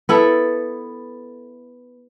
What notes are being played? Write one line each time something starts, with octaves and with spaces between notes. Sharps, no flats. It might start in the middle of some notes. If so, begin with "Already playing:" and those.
B3 E4 A4